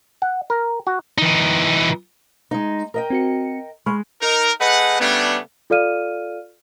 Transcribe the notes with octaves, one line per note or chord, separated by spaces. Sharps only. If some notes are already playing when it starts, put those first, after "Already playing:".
F#5
A#4
F#4
E3 D#4
G#3 D#4
A#4 D#5 G5
C4 F#4 C#7
G#3 B5 C#6 F6
D#4 A#4
A3 G#4 B4 D#5 F#5
C#3 G3 A3 B3 D4
F4 A4 D5 F5 F6 D#7